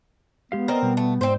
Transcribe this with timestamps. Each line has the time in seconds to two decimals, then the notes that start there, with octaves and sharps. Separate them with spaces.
0.52 G#3 B3 G4 F5
0.68 C4 A#4 D5 D#5
0.82 B2 G3
0.97 A3
1.21 G#2 C4 C5